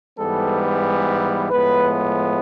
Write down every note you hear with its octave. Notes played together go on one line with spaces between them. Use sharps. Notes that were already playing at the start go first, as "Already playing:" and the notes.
G#2 E3 G3 B3 A4
A2 F3 G#3 B3 B4